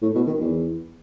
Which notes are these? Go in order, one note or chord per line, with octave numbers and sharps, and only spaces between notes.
A2
B2
D#3
E2